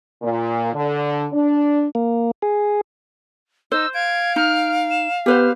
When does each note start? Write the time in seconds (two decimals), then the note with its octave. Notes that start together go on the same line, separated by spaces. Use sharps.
0.21 A#2
0.73 D3
1.32 D4
1.95 A#3
2.42 G#4
3.72 D#4 C5 E6
3.94 F5 G#6 D7
4.36 D#4 F6
4.91 E7
5.26 B3 G4 B4 C5 F6